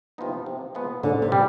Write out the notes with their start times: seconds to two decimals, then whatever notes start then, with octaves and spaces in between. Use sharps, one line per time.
0.18 C3 F3 B3 D#4
0.46 C3
0.75 F3 G#3 B3
1.03 G#2 D3
1.22 C3
1.32 G3